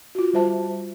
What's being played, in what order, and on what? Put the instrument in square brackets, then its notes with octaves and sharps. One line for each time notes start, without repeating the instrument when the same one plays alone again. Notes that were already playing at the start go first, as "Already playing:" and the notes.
[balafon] F4 F#4
G3 F4 C5 E5 A5